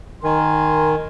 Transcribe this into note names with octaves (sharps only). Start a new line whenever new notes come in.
D#3 A#4 G#5 C6